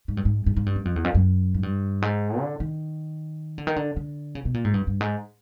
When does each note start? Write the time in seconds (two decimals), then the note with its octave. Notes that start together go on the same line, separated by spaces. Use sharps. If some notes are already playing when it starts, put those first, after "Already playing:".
0.08 G#2
0.17 G2
0.25 G#2
0.46 G#2
0.56 G#2
0.66 G2
0.76 F#2
0.85 F2
0.96 E2
1.04 F2
1.15 F#2
1.54 G#2
1.63 G2
2.02 G#2
2.40 D3
2.60 D#3
3.58 D3
3.67 D#3
3.76 D3
3.96 D3
4.35 C#3
4.45 B2
4.54 A#2
4.65 G#2
4.74 G2
4.87 G2
5.01 G#2